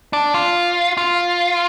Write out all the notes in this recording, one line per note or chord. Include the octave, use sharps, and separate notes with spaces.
D4
F4
F4